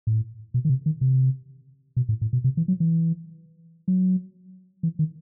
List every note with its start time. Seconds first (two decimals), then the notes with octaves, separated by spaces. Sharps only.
0.07 A2
0.54 B2
0.65 D#3
0.70 C3
0.86 D#3
1.01 C3
1.97 B2
2.09 A2
2.21 A2
2.33 B2
2.44 C3
2.57 E3
2.68 F#3
2.80 E3
3.88 F#3
4.83 E3
4.99 D#3